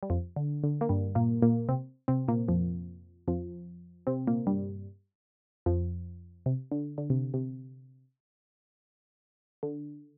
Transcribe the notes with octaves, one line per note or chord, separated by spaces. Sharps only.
G3
F2 F3
D3
D3
A#3
G2 G3
A#2 A#3
A#2 A#3
C3 C4
C3 C4
A#2 A#3
F2 F3
F2 F3
C3 C4
A#2 A#3
G2 G3
F2 F3
C3
D3
D3
C3
C3
D3